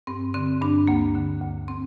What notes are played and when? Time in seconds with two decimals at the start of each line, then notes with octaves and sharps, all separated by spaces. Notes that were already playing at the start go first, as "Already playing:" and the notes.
0.07 G2 C4
0.34 D3 C4
0.62 G2 D4
0.88 D2 A#3
1.15 D3
1.42 D2
1.68 C4